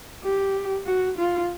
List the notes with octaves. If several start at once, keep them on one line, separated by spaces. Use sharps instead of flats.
G4
F#4
F4